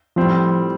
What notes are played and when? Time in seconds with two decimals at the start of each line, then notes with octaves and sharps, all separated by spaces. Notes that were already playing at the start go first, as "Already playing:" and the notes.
0.16 A2 F3 G3 C4 F4